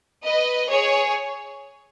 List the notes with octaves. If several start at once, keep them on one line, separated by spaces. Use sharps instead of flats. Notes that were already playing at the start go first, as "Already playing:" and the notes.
B4 D#5
G#4 C#5